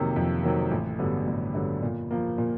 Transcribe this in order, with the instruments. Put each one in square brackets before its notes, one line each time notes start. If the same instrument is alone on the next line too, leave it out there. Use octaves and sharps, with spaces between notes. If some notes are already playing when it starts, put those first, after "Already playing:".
Already playing: [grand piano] F2 C3 D#3 F#3 A#3
F2
C3 D#3 F#3 A#3
A1
G2 D3 F#3 B3
A1
G2 D3 F#3 B3
A#2
F3 A#3
A#2